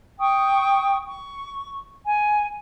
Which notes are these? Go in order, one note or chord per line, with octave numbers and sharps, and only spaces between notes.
G5 C#6 D#6
C#6
G#5